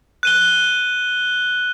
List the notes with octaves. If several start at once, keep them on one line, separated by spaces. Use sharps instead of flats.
F#6 D#7 G7